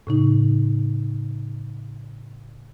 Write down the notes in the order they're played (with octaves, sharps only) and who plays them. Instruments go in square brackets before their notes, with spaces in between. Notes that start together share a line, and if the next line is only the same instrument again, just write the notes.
[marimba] A2 C#3 D#4